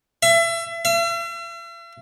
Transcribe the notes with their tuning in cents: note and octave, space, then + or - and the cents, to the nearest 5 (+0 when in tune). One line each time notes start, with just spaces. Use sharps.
E5 +30
E5 +45